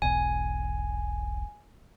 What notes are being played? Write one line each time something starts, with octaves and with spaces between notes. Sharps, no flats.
E1 B1 G#5